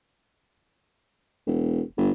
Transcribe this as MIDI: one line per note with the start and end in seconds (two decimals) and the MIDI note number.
1.47 1.81 28
1.98 2.11 31